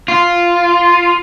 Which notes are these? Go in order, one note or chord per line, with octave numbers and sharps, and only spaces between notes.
F4